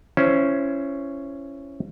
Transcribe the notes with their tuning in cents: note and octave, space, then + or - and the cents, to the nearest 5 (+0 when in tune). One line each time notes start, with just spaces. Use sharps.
C#4 +0 E4 +25 C5 +0